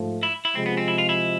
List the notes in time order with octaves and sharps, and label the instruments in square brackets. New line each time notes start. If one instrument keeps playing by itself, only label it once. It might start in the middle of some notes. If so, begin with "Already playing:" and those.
Already playing: [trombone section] G#2 F3 A3
[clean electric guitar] E4
E4
[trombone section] C3 F3 G#3 [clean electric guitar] C4
[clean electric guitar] B3
C4
E4
F4
E4